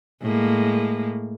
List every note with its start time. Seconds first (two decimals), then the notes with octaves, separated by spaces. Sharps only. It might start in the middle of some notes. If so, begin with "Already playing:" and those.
0.22 A2 G#3 A#3